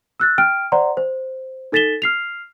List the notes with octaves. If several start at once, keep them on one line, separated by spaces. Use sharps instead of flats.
E6 F#6 A6
G5 F6 D7
C5 D5 F#5 A#5 C6
C5
D#4 A4 A6 B6 E7 G7
F6 C7 F7